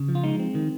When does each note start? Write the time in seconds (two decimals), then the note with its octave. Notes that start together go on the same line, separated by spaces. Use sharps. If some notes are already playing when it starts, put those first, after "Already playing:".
Already playing: C#3
0.09 F3
0.15 F4
0.24 G#3 D#4
0.39 C4
0.55 D#3